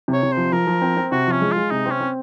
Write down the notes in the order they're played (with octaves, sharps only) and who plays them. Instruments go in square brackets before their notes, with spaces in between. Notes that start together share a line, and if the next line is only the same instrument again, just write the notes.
[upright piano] C3
[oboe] C#5
[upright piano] C3
[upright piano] F3 [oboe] C5
[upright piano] F3 [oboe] A#4
[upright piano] F3
C4
C4
[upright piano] C3 [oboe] F#4
[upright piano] F3 [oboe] C#4
[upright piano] G#3
[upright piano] G#3 [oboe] F4
[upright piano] C3 [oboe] D#4
[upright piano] C4
[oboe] C#4
[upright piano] C4